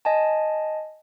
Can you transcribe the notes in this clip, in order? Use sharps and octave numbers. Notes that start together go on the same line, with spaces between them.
D#5 G#5 A5